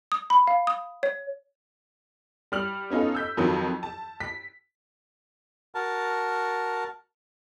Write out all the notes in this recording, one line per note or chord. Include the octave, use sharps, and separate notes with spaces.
D#6
B5
F5
D#6
C#5
G3 F6 F#7
B3 C#4 D#4 F4 A4
E6 G6 B6
F2 D#3 F3 F#3
A5
B6
F#4 A#4 A5